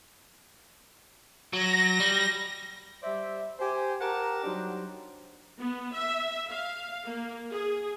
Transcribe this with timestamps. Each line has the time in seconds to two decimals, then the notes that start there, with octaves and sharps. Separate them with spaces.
1.53 F#3 A#6
2.00 G3
3.03 G3 C5 D5 E5
3.59 G4 C5 G#5
4.01 G4 A#4 F#5 A5 A#5
4.44 F#3 G3 D4 D#4 G4 C5
5.59 B3
5.93 E5
6.49 F5
7.05 A#3
7.51 G#4